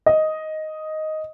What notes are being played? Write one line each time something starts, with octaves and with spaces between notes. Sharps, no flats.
D#5